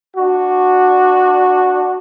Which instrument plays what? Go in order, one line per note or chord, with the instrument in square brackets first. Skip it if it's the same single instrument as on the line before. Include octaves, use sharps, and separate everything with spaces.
[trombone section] D4 F#4